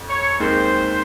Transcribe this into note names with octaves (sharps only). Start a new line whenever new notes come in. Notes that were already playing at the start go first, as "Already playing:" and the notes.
Already playing: F2
C#5
D#2 D#3 G#3 C4 C5